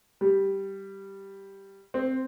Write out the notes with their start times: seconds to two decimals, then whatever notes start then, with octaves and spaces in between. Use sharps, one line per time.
0.21 G3
1.94 C4